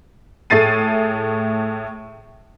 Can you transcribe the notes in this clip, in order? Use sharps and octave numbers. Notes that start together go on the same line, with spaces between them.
A2 A3 G#4 A6 C7 D#7